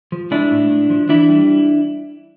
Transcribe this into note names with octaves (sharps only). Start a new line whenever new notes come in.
F3
G#3 D4 E4
A2
A2
F3
E3 D4 E4
G3